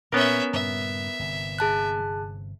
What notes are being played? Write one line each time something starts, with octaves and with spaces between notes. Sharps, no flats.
A#2 B3 C#4 A#4 E5
G2 A#2 C#3 E5
G1 C3
G#4 A5 F#6